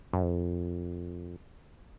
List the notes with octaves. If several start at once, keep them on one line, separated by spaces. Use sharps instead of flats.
F#2
F2